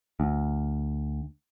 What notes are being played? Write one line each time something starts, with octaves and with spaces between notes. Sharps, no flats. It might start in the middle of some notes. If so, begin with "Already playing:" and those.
D2